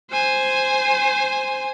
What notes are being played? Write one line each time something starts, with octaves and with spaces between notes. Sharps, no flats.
C5 G#5